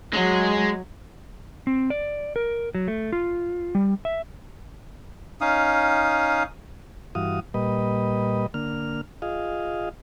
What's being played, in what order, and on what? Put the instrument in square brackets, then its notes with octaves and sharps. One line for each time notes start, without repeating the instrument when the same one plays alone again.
[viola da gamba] F#3 [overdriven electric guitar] G#3
[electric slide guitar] C4
D5
A#4
F#3
A3
F4
G3
E5
[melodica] C#4 D#4 F5 D#6
[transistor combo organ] G2 E3 F#4 F5 D#6
A#2 G3 B4 D#5
D3 A#3 F6
F4 G#4 D#5 F5